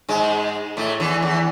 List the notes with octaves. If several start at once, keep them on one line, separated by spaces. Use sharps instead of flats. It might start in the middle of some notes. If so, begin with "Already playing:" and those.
G#2 G#3
A2 A3
E2 E3
E2 E3